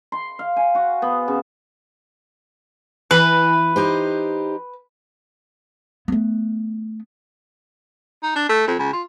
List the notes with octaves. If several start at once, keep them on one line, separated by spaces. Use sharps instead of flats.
C6
F5
G#5
F#4
B3
C#3
E3 B4
D#4 G4 C5
A3 B3
D#4
D4
A3
F2
C#2
F4